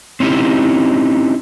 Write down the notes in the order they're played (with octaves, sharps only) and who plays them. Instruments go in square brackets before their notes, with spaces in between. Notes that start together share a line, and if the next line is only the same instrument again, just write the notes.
[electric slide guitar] C4 C#4 D#4 E4 G4